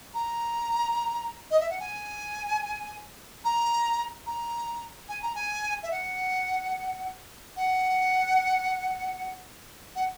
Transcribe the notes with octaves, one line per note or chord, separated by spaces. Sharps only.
A#5
D#5
E5
F#5
G#5
A#5
A#5
G#5
A#5
G#5
E5
F#5
F#5
F#5